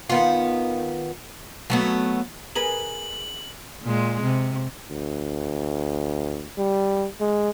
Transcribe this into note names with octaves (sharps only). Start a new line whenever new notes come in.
D#3 B3 F4
F#3 A3 B3
G#4 A#4 B4 F#7
A#2 G#3
C3
D2
G3
G#3